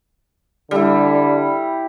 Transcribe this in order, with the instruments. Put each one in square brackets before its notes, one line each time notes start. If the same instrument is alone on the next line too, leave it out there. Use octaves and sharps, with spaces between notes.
[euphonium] D3 [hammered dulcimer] G3 E4